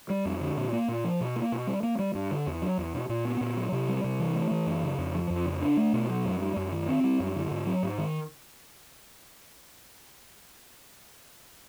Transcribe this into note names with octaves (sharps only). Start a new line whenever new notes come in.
G3
F2
D3
A#2
A#3
A#2
F3
B2
A#3
B2
G3
A#3
G3
G2
D3
E2
F#3
E2
B2
A#2
B3
A#2
F#3
C3
G3
C3
E3
A3
E3
F#2
C#3
F2
F3
F2
C#3
D4
A3
B2
F#3
F#2
G3
F#2
D#3
C4
G3
F#2
D3
G#2
F#3
G#2
D#3